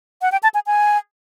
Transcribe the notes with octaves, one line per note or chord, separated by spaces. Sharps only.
F#5
G5
A5
G#5
G#5